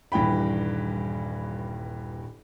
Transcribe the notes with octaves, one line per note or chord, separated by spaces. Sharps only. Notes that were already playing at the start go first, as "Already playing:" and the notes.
D#1 G2 E3 G5 B5